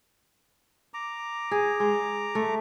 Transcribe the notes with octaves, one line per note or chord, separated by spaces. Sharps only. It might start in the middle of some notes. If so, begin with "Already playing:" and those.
A#5 D6
G#4
G#3
A3